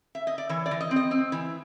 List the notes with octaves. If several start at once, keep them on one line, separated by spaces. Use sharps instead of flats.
E5
D#5
D5
E3 C#5
D5
E3
D#5
C4
D#5
C4
E3